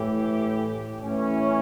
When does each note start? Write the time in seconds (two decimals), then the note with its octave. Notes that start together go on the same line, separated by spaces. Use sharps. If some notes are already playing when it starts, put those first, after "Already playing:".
Already playing: A2 E3 G4
1.01 A2 E3 C#4